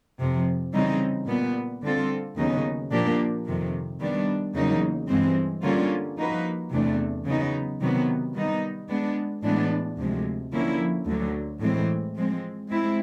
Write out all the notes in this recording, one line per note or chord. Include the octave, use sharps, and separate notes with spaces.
F2 C3 F3
C#3 E3 G3 C4 D#4
A#2 G3 B3
D3 G3 C4 F4 A4
D#2 C#3 F#3 B3 D#4
A#2 F3 A#3 D4 G4
F2 C3 D#3
D#3 G3 B3 D4
E2 C#3 F#3 A#3 D#4
G2 E3 G#3 C4
D3 G3 A#3 C#4 F4
F3 A#3 D#4 F#4 B4
E2 C3 E3 A3 D4
C#3 F#3 B3 D#4
C3 D#3 F#3 B3
D#3 G3 B3 D#4
G#3 B3 D4
A2 E3 G#3 B3 D4
D2 C3 F3 G#3
D3 F3 A#3 C#4 E4
D2 D3 F#3
A2 E3 G#3 C4
F3 G#3 C4
G#3 C4 E4